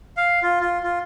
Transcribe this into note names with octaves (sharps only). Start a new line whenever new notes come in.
F5
F4
F4
F4